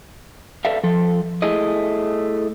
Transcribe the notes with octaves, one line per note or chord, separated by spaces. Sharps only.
A4 B4 D5 E5 F5
F3 A4
A3 E4 G#4 D#5